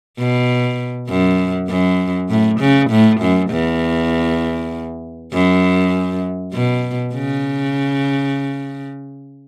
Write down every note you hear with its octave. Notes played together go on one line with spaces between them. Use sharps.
B2
F#2
F#2
A2
C#3
A2
F#2
E2
F#2
B2
C#3